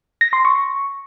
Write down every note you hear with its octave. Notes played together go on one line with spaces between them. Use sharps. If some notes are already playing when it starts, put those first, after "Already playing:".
A#6
C6
C#6